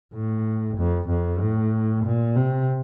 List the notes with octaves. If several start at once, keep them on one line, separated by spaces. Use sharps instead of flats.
A2
F2
F2
A2
A#2
C3